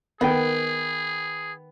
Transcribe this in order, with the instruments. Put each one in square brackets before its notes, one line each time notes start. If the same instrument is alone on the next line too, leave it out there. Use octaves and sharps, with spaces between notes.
[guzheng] D#3 [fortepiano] B3 B4 G5 [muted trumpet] G#4